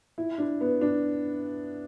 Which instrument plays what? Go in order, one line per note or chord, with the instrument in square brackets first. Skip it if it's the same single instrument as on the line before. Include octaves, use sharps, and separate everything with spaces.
[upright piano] E4
D4
B3
D4